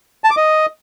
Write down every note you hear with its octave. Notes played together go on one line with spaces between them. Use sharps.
A5
D6
D#5